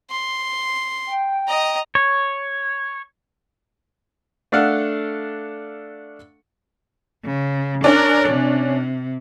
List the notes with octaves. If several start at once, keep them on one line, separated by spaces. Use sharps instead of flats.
C6
G5
D#5 A#5
C#5
A3 D4 A4 F5 F#5
C#3
C#4 D4 A#4 D5
C3